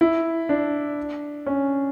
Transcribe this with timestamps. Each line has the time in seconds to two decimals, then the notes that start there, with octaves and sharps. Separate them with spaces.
0.01 E4
0.49 D4
1.46 C#4